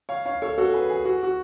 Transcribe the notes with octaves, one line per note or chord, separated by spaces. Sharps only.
C#5 F5
C#5 F5
A4 C#5
F#4 A4
G#4 B4
G#4
F#4
F#4